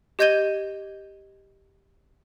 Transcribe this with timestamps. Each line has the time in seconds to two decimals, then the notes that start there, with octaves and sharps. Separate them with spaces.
0.19 G4 D#5 G6 G#6 D#7 G7